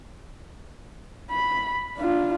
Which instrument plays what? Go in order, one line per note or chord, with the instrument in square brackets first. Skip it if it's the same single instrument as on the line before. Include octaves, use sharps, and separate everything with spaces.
[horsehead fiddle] B5
D4 F4